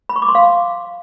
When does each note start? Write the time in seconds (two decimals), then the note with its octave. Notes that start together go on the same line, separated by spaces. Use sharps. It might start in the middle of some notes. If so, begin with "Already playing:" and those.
0.09 B5
0.16 C#6
0.22 D6
0.29 C6
0.35 F5